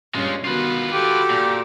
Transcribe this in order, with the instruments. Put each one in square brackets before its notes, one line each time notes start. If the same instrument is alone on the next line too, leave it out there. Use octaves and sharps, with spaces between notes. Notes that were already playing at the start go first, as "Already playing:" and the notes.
[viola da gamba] G2 A#2 C#4 [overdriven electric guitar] G#3 F4
[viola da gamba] D#3 B3 F#4 [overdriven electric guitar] F4 B4
[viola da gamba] F#4 A4 [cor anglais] G4
[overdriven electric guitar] A#2